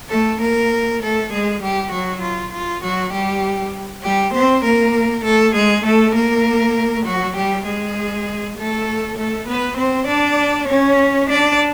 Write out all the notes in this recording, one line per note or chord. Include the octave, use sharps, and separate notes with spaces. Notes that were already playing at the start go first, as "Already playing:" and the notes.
A3 A4
A#3 A#4
A3 A4
G#3 G#4
G3 G4
F#3 F#4
F4
F4
F#3 F#4
G3 G4
G3 G4
C4 C5
A#3 A#4
A3 A4
G#3 G#4
A3 A4
A#3 A#4
F#3 F#4
G3 G4
G#3 G#4
A3 A4
A3 A4
B3 B4
C4 C5
D4 D5
C#4 C#5
D4 D5